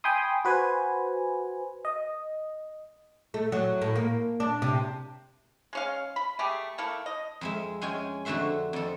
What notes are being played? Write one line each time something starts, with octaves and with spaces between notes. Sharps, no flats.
G5 G#5 B5 C6 D#6
F#4 B4 C5 G#5
D#5
A3
F#3
A2
A#3
D4
C3
G#3 C#4 F5
B5
A3 G4 G#4
A3 A#3 E4 A4
D#5
F2 G#3 E5
G#3 C#4 G5 G#5
F2 D3 A3 F#4 E5 C6
F2 A4